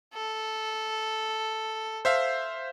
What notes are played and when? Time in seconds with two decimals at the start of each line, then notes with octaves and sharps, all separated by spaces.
0.14 A4
2.05 C5 E5 F5